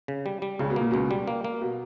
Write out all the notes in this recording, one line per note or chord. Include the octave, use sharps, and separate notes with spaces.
C#3
G3
G3
C#2 C#3
B2
A#2 A#3
C#2 B2
G3
A#3
A#3
B2